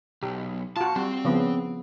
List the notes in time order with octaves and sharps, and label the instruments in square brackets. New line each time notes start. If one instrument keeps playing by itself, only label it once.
[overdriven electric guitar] B1 [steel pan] G4
[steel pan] F4 F#4 [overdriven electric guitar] A5
[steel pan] G3 [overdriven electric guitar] C4
[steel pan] C#3 F3 B3